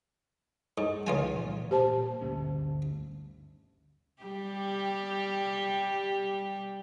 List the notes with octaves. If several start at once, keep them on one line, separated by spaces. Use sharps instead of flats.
G#2
C#2 F3 F4 G#5
A#2 E3 G3
A#2 A#3 G4 C5 A5
G1 D2 C#4
G3 G4